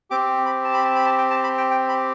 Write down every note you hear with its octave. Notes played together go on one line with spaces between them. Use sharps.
C4 G4 D6
B5
A5
B5
A5
B5
A5
G5
A5
B5
G5
G5
B5